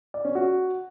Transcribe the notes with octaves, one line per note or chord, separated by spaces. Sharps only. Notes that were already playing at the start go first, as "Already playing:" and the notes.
D5
C#4
F#4